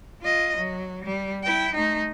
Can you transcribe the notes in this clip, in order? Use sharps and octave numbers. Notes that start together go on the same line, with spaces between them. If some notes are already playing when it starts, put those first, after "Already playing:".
F4 D#5
F#3
G3
E4 G5
A3 D#4